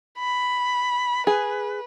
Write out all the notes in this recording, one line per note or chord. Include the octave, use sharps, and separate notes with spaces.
B5
G#4 B4